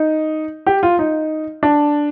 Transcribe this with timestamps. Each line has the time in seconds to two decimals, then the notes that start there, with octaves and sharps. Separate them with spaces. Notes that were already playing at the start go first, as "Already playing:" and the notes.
Already playing: D#4
0.67 G4
0.83 F4
0.99 D#4
1.63 D4